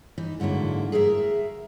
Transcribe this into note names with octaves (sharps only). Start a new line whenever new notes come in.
E3 D#4
G#2 D3 F#3 A#3 E4
G#4 A#4 B4 E5 A#5